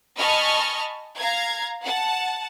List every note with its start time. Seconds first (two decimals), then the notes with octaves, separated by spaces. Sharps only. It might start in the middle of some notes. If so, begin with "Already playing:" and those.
0.18 D#5 G#5 A5 B5 C#6 F6
1.18 F5 A#5 G#6
1.82 F#5 A5